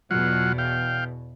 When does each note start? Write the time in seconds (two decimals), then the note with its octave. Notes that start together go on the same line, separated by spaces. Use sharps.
0.11 E2 B2 F#3 F4 F#5
0.58 F5 G5